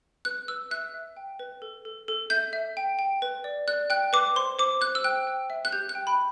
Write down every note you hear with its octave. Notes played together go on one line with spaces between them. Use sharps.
B4 F#6
B4 E6
E5 F#6
E5
G5
B4
A4
A4
A4
E5 G6
E5
G5
G5
B4
D5
D5 F#6
G5 F#6
B4 D6
C5 C6
C5 D6
C5 F#6
E6
G5 F#6
G5
E5
F#6
G4 G6
F#6
G5
B5